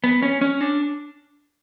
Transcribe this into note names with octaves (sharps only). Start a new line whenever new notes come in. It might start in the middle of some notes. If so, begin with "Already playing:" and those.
B3
C#4
C#4
D4